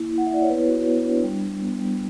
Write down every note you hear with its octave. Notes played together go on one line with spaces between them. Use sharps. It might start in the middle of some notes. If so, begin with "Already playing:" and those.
Already playing: A#3 E4
E4
F#5
E5
E4 D5
C#5
B3 B4
F#4
B3
D4
G3
G3
B3
G3